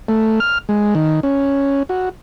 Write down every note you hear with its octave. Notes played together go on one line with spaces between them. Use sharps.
A3
F6
G#3
D#3
C#4
F#4